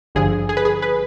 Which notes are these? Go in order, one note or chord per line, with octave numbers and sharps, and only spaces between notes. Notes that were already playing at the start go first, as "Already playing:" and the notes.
G#1 G2 D3 F3 G#4
G#4
B4
G#4
B4